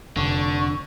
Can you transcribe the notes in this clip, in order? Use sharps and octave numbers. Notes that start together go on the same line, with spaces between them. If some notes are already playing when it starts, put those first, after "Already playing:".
F1 D3 C#6